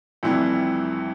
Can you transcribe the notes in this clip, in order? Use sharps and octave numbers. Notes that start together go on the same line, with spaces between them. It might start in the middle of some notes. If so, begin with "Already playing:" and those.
F1 F2 C3 E3 G3